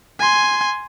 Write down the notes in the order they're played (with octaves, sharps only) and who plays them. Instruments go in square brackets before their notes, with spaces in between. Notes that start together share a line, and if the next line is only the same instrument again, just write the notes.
[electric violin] G#5 C6